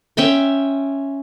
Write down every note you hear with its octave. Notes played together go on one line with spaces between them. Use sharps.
C#4 E5 G5 C6